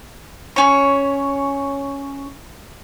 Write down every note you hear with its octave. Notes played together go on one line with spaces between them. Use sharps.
C#4 C#5